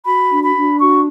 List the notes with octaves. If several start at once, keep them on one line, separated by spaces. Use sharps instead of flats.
F#4 B5
D4
B5
D4
F#4 C#6